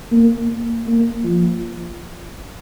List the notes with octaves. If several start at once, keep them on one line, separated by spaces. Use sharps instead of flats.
A#3
A#3
F3